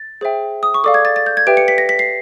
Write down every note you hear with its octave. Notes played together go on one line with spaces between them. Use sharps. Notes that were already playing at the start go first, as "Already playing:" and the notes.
Already playing: A6
G#4 C5 E5 G5
D#6
C#6
A4 D5 F5 D6
G#6
A6
A6
G6
G#6
G4 B4 E5 G5 D7
C#7
B6
A#6
B6
C7